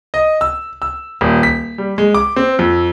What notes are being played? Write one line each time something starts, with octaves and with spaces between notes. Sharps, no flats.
D#5
E6
E6
D#1
B6
G3
G#3
D6
C4
F2